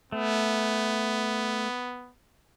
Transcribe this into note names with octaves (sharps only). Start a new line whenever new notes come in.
A3 B3